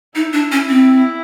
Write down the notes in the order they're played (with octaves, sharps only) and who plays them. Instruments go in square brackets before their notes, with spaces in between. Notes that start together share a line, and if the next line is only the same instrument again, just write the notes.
[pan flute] D#4 [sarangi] E4
[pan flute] D4
C#4
C4